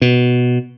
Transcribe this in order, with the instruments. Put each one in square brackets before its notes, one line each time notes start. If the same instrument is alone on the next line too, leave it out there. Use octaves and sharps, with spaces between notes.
[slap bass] B2